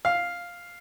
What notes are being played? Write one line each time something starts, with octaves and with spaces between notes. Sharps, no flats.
F5